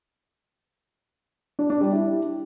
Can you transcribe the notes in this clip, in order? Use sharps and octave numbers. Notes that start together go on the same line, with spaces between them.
D4
D4
G3
E4